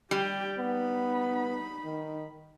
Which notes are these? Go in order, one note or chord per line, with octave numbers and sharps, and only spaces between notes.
G3 G4 G5
B3 D#4 B5
D#3